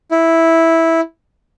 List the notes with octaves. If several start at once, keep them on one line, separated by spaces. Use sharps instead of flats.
E4